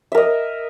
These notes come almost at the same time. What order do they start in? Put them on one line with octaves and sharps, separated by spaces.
E5 A#4 D#5